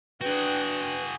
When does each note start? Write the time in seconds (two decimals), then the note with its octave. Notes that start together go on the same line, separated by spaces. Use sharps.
0.21 D4 F#4 G#4 B4 G5